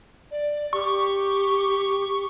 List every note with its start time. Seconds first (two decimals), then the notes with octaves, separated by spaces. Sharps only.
0.31 D5
0.73 G4 C#6